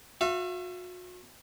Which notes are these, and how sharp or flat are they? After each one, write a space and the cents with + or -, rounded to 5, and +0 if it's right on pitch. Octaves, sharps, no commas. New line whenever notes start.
F#4 -40 E5 +35